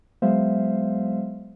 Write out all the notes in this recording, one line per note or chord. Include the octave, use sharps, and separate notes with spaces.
F#3 G#3 B3 C5 E5 F5